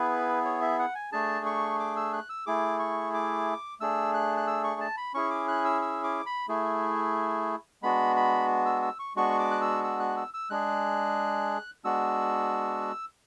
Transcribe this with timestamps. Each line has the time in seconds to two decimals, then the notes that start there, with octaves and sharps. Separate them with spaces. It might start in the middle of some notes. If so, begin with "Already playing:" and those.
Already playing: B3 E4 G#4 B4
0.45 C#5
0.62 E5
0.79 F#5
0.95 G#5
1.12 A3 D4 G#4 A5
1.46 C#6
1.80 D6
1.97 E6
2.13 F#6
2.29 E6
2.46 A3 E4 G#4 D6
2.79 C#6
3.14 D6
3.80 A3 D4 G#4 E6
4.14 F#6
4.37 F#6
4.47 E6
4.64 C#6
4.80 A5
4.97 B5
5.14 C#4 E4 G#4 C#6
5.31 D6
5.48 F#6
5.65 E6
5.82 E6
6.04 D6
6.26 B5
6.48 A3 E4 G#4
7.82 G#3 B3 D4 F#4 B5
8.16 B5
8.66 E6
8.82 E6
8.99 C#6
9.16 G#3 B3 D4 F#4 C#6
9.39 D6
9.51 F#6
9.62 E6
9.84 E6
10.00 F#6
10.17 E6
10.34 E6
10.50 G#3 D4 G#4 F#6
11.84 G#3 B3 D4 F#4 E6